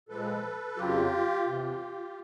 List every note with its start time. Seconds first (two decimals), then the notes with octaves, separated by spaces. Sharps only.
0.08 A#2 F3 G#3 A4 B4
0.76 F2 C#3 F#3 F4 G4
1.46 E2 C3 E3